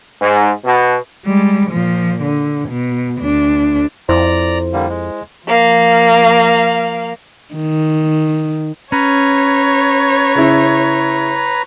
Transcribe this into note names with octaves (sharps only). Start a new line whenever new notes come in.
G#2
B2
G3 G#3
A#2 F3
D3
B2
D2 D4
F2 E4 C5 D5 A#5
D3 G3 A#3
G#3
F3 A#3 F5
D#3
C#4 B4 C#5 A#5
C#3 E4